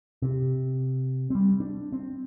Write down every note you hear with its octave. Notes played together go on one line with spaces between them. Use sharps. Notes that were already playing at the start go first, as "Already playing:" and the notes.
C3
G3 C4
D4
C4